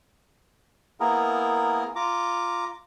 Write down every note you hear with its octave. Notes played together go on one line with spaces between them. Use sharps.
A#3 B3 E4 G#4 A#4
F4 A#5 D6